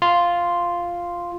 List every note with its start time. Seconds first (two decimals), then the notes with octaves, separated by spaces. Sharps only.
0.02 F4 C6